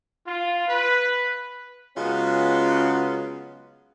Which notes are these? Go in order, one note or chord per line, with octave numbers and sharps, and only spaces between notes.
F4
B4
C#3 F#3 G#3 B3 C#4 F4